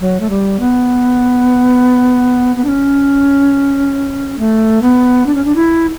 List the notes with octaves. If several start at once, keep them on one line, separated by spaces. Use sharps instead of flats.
F#3
A3
G3
B3
B3
D4
C#4
A3
B3
D4
C#4
D4
E4